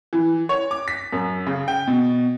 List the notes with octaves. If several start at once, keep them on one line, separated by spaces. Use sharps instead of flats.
E3
C#5
D6
B6
F#2
C#3
G5
B2